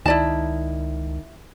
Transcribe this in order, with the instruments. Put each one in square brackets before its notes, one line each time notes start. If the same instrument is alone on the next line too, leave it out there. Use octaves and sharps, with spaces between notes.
[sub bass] C#2 [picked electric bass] D#3 [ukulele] E4 D5 A5